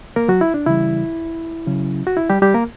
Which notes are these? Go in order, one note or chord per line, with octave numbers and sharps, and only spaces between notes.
A#3 A#4
F#3 F#4
E4
D4
C#3 E3 G3 E4
C#3 F#3 C#4
F#4
E4
G3 G4
G3 G4
A#3 A#4